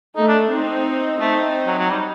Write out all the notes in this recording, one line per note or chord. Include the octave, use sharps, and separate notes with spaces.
A3 D#4
D4
C4 D#4
A3 C4 D#4
F#3
F#3
G3